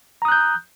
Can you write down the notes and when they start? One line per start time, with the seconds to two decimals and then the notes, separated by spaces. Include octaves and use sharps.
0.22 A#5
0.25 D#6
0.28 F#6
0.32 G6